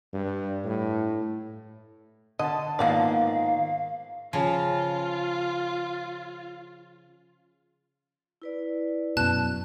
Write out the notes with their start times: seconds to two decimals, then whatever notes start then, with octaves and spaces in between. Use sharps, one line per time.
0.14 G2
0.65 A2
2.39 D3 D#5 A5
2.79 G#2 D#3 F3 A#3 B3 D5 F5
4.33 C#3 F3 F4
8.42 E4 B4 D5
9.17 F#2 B2 A5 F#6